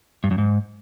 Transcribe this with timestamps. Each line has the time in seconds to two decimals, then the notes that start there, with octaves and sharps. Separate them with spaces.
0.24 G2
0.31 F#2
0.38 G#2